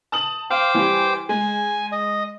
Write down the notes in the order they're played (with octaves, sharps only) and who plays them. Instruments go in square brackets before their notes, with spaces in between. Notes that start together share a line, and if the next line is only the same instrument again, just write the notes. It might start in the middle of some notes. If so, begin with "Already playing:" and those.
[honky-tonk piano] A5 D#6 F#7
[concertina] C5 G5 D6 [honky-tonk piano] F5
[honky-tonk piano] E3 G3
[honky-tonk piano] G#3 [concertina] G#5
[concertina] D#5